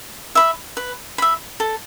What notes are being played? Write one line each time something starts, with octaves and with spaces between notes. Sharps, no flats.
E5 B5
B4
E5 B5
A4